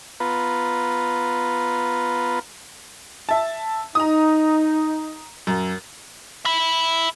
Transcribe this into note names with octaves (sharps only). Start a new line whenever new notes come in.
B3 F4 B4 A#5
E5 A5
D#4 A#5 D#6
F#2
E5 B5